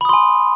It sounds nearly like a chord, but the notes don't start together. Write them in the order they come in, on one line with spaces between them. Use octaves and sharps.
B5 D#6 C6 G#5